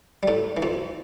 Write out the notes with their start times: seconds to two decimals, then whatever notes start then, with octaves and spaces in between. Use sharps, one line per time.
0.23 G3
0.28 A2 A3
0.57 E3
0.62 F2 F3